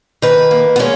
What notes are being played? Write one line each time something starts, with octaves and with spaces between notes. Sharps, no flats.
D#3 B4
A#3
B3
G#3 C#4